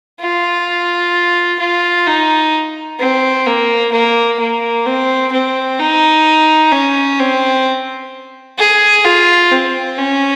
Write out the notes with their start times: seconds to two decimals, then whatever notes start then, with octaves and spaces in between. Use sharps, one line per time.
0.21 F4
1.59 F4
2.07 D#4
3.00 C4
3.46 A#3
3.92 A#3
4.39 A#3
4.86 C4
5.32 C4
5.79 D#4
6.72 C#4
7.19 C4
8.59 G#4
9.05 F4
9.51 C4
9.98 C#4